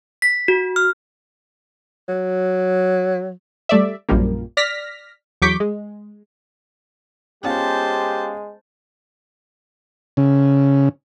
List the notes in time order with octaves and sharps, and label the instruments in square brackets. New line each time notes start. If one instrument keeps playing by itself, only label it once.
[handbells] B6
F#4
F6
[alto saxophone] F#3
[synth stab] G3 A3 D5 E5
A#1 F#2 F3 G3 A#3
D5 F6 A#6 B6
E2 F#3 C#6 D6 G6 B6
G#3
[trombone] G#3 [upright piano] B3 C#4 F4 [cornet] G4 [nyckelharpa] C5 A5
[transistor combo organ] C#3